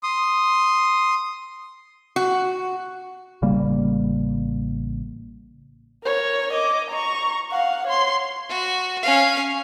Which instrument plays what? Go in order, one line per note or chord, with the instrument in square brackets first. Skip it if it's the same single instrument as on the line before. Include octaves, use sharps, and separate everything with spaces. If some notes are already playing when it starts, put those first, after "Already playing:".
[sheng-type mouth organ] C6 D#6
[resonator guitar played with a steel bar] F#4
[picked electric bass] A1 C#3 G3 A#3
[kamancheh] A#4 C#5
D#5 D6
A#5 C#6
F5 F#5
C#5 C6
[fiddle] F#4
C#4 F5